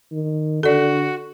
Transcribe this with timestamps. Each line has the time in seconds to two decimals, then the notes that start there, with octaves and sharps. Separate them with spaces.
0.12 D#3
0.63 D3 F#4 A4 D5